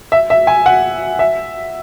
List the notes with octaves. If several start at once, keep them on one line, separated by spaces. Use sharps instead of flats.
E5
E5
G#5
F#5
E5